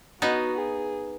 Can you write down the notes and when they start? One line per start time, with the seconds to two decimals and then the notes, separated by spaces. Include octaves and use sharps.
0.21 B3 D#4 F#4
0.58 G#4